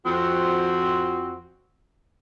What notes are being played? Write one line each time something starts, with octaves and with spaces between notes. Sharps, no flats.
F2 F3 C4 F#4